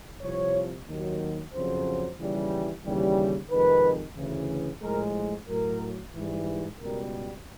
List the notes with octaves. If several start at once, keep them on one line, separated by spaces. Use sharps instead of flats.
C2 C3 F3 C#5
D#2 D#3 F#3
F2 C#3 F#3 C5
D#2 C#3 E3 G3
D#2 C#3 E3 G3
F2 C3 D#3 G#3 B4
D2 C#3 E3
A2 F3 G#3 A#4
A2 F#3 A#4
G#2 E3 G3
C#2 B2 G3 A#4